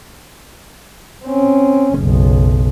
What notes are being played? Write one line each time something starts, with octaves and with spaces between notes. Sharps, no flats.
C4 C#4
F#1 B1